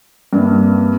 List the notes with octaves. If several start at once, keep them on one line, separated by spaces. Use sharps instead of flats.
G2 A#3 C4